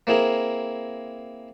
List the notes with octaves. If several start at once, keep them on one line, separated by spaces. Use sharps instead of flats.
A#3 C4 E4 G#4 A#4